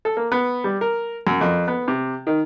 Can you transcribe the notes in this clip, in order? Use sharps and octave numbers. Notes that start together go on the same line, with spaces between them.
A4
A#3
B3
G3
A#4
F#2
F2
B3
C3
D#3